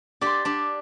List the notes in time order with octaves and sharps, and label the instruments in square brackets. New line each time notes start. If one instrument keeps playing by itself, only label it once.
[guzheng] D4 G4 [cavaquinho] D5 C6
[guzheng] D4 G4